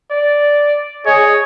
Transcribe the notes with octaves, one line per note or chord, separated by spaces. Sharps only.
D5
G#4 C#5 D#5